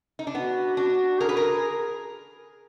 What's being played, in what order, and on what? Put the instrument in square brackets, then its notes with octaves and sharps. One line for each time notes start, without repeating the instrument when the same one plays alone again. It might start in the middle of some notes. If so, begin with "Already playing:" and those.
[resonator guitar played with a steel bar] D#4
D4
[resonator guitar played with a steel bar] B3 [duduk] F#4
[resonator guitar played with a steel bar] D4 [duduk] F#4
[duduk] G#4 [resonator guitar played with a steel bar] A#4
[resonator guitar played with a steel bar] B4
A#4